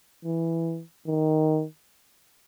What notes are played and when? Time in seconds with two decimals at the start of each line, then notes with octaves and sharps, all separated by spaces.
0.25 E3
1.07 D#3